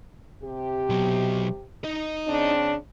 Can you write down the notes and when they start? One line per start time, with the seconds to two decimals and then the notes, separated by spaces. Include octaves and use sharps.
0.43 C3 G4
0.90 B2 F#3
1.84 D#4 D#5
2.27 C#3 C4 D4